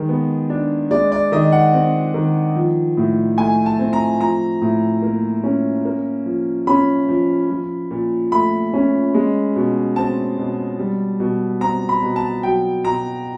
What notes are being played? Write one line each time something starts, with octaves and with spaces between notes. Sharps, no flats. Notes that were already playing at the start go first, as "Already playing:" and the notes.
Already playing: D#3 G#3
B3
D4
G#3 D5
D5
D#3 D#5
F#5
C4
D#3
F3
A2
A3 G#5
A5
C4
A#5
F3 A#5
A2
A#3
C#4
A#3
F3
C#4 B5
F3
F3
A#2
A3 B5
C#4
G#3
B2
C4 A5
B2
G3
B2
C4 A#5
B5
B2
A5
F#3 G5
B2 A#5